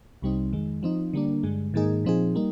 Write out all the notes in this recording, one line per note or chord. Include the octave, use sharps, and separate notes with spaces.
C2 C3 G3 C4 D#4
F2 D#3 G#3
F3 C4 D#4
D3 G3 A#3 D4
G2 D3 G#3
G#2 D#3 A#3 D#4 G#4
A#2 F3 C4 D#4 G#4
G3 A#3 D#4